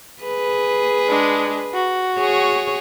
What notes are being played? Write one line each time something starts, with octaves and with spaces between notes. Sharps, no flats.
G#4 B4
G#3 D4
F#4
G#4 C#5